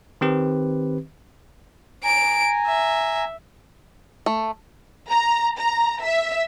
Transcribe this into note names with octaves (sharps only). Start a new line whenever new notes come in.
D#3 C4 G4 B4
G#5 A#5 D7
E5
A3
A#5
A#5
E5